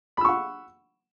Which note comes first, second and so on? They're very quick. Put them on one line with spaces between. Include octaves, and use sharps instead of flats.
B5 E6 C#6 F#5